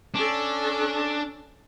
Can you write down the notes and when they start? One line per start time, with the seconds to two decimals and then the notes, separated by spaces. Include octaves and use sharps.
0.15 C#4 D4 A4